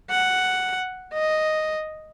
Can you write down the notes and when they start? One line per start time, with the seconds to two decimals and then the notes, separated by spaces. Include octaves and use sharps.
0.10 F#5
1.13 D#5